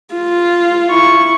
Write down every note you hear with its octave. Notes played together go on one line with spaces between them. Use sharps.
F4
E4 C#6